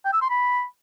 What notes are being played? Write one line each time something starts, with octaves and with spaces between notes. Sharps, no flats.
G5
E6
C6
B5